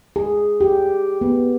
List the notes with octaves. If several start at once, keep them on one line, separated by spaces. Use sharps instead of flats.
G#4
G4
B3